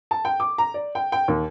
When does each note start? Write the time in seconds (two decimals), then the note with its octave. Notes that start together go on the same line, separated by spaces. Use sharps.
0.11 A5
0.25 G5
0.40 D6
0.58 A#5
0.74 D5
0.95 G5
1.12 G5
1.28 D#2